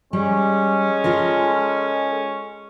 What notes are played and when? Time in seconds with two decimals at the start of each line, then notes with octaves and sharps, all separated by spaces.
0.13 G3 G#3 C#4
1.04 F4 A4 A#4